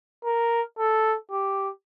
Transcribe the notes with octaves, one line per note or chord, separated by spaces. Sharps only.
A#4
A4
G4